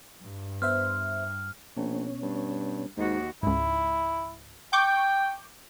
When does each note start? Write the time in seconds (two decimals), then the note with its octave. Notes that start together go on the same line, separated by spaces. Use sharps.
0.22 G2
0.62 B3 C5 E5 F6
1.76 A#1 B2 C#4
2.23 G2
2.97 D#2 G#2 F#4
3.43 C#2 G#2 E4
4.73 G5 C#6 D6 G6